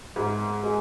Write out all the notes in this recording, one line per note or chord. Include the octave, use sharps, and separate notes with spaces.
G#2
G#3